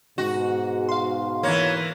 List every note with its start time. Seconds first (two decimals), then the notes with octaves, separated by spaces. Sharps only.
0.18 G#2 B2 F#4
0.89 F5 C6
1.43 E3 A#3 C#5